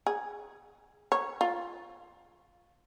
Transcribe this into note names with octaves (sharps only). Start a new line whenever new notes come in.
G#4
C#5
F4